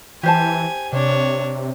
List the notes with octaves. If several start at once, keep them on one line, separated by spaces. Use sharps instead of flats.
E3 G4 C5 G#5 A5
C3 D4 C#5